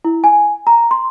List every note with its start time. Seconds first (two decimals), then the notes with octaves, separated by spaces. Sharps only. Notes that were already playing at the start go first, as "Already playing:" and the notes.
0.05 E4
0.24 G#5
0.67 A#5
0.91 C6